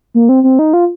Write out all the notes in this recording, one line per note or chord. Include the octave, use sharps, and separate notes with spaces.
A#3
C4
C4
D#4
F4